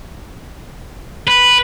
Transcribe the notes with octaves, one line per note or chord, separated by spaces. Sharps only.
B4